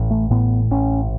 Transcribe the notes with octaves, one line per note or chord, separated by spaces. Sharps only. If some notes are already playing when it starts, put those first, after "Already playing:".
Already playing: A1 A2
A3
A2 B3
A1 C#4